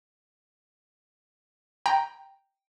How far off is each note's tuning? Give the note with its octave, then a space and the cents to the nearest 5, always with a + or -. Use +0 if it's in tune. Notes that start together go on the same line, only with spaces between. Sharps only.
G5 +0 A#5 +0